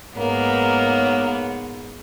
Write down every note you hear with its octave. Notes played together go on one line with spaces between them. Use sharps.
G#2 A#3 B3 A#4 C#5